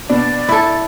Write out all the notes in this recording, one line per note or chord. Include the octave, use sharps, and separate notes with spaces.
B2 D4 D5
E4 A4